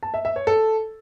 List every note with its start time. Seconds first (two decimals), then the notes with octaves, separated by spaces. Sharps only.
0.03 A5
0.14 E5
0.25 E5
0.36 C#5
0.47 A4